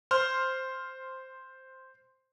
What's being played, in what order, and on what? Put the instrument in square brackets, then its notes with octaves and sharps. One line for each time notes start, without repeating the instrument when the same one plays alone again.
[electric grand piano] C5 C6 F6